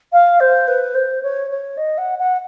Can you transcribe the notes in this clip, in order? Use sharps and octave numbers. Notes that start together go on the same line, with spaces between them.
F5
C5
B4
C5
C#5
C#5
D#5
F#5
F#5